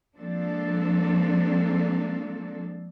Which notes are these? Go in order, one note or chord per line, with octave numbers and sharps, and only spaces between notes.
F3 G#3 A#3 C4 D4 A4